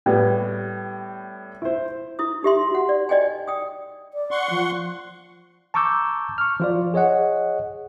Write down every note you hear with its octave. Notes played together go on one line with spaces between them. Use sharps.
A2 G3 B3
E4 C5
E4 D#6
D#4 G4 E5 C6
F#4 F#5
D5
D5 D#5 G5 G#5
G5 D#6
D5
F#5 C6 C#6
F3
A5 A#5 C#6 D6 E6 G6
C#6 F6
F3 F4 D5
G#4 C#5 D#5 F#5